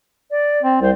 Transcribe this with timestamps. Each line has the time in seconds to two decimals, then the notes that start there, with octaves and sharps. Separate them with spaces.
0.31 D5
0.63 C4
0.81 C2 C5